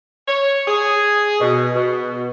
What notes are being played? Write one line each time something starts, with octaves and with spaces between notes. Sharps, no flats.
C#5
G#4
B2
B2